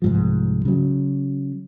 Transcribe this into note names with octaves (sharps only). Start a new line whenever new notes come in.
C2 G#2 F3
C#3 F#3